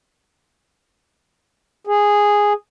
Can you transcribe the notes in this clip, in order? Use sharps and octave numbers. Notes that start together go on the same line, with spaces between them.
G#4